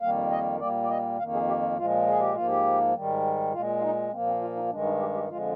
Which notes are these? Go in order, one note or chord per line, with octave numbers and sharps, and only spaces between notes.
F2 D#3 G3 A#3 F5
D#5
A#2 G3 A#3 D5
D5
D#5
F2 D#3 A#3 F5
G#4
G4
F4
A#2 F3 G#3 F4
G#4
G4
G#2 F3 A#3 F4
G4
G#2 D#3 G3
A#2 G#3 F4
F4
D#4
A#2 F3 A#3 C4
C4
F4
D#4
G2 D#3 G#3 D4
D#4
G4
G4
F2 D3 F3 G#3 F4